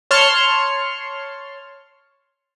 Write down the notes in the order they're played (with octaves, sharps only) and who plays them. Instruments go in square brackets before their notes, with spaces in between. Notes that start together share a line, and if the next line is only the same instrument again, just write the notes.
[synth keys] C#5 A5 C6 F6 C#7